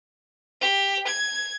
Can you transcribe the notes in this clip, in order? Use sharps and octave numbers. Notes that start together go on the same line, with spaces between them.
G4
G#6